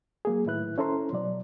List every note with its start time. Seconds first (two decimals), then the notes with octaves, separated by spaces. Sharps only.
0.25 F#3 A#3 G#4
0.46 A2 D#3 E4 B4 F#6
0.78 C#4 E4 A4 C5 A#5 C6
1.13 B2 F#3 D5